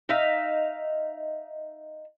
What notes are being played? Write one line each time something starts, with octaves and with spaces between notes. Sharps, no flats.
D#4 E5 F5